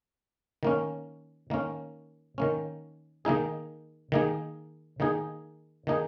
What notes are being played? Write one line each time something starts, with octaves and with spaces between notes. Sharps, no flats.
D#3 A#3 C#4
D#3 A#3 C#4
D#3 A#3 C#4
D#3 A#3 D#4 G#4
D#3 A#3 D#4 G#4
D#3 A#3 D#4 G#4
D#3 A#3 D#4 G#4